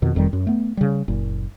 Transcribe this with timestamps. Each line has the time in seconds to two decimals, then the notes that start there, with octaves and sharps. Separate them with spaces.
0.02 F2 B2 D#3
0.15 F1 F2 D#3 G3
0.33 F#2
0.47 A3 B3
0.77 C#3 G3
1.08 F#1 A#2